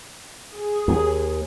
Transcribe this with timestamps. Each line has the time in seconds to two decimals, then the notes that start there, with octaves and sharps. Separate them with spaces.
0.54 G#4
0.88 D#2